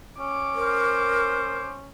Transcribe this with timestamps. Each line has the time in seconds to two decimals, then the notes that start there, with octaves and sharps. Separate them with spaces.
0.19 C#4 D6
0.55 A#4 C5